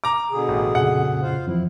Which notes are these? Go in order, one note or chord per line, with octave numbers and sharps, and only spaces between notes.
A#5 D6
B2 D3 G#4
A1
F2 A#2 C#3 F#5
F4 C5 F5
F2 E3 F3 E4